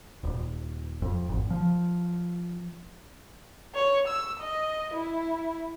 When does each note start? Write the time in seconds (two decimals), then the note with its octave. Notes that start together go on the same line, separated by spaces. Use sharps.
0.23 D#1
1.02 F2
1.29 G#1
1.50 F3
3.75 C#5
4.07 E6
4.40 D#5
4.94 E4